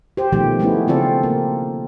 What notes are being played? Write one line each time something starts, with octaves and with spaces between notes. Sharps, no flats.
G4 C5
B2 D#3 F3 A3 G4
G#3 A3 B3 C#4 E4
C#3 C4 F4 A4 D5
A#3